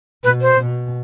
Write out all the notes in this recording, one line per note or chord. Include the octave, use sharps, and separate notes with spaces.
B2 B4
C5
B2